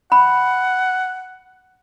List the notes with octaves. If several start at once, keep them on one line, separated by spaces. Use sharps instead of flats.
F#5 B5